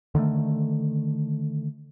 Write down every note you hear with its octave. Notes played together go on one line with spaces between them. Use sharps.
D3 D#3 G3 A3